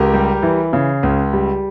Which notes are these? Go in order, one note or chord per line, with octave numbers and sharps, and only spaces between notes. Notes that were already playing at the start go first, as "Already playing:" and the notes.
Already playing: C#2 G4 A#4
G3
E3
C#3
C#2
G3